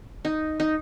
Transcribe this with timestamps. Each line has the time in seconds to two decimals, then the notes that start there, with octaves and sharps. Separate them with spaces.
0.25 D#4
0.60 D#4